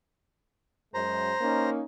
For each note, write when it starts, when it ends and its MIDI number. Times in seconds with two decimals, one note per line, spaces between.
0.94 1.32 42
0.94 1.32 56
0.94 1.70 72
0.94 1.70 82
1.40 1.82 58
1.40 1.82 61
1.40 1.82 63